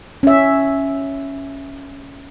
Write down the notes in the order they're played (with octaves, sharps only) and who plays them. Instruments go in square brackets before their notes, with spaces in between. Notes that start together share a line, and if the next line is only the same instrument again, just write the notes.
[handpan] C#4 E5